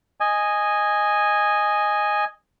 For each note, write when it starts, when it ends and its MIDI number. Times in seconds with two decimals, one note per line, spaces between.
0.20 2.25 75
0.20 2.25 80